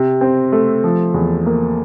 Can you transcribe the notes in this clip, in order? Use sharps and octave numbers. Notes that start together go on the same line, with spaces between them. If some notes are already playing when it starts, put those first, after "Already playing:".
Already playing: C3
C4
A3
F3
E2
A#3